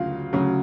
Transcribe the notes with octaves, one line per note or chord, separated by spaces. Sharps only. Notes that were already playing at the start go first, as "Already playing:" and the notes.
Already playing: D2 C#3 F#3 F4 F5
D2 C#3 F#3